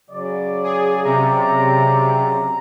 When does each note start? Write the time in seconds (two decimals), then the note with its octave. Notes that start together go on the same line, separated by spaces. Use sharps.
0.10 C#3 F#3 D5
0.64 G#4
1.05 C3 A#5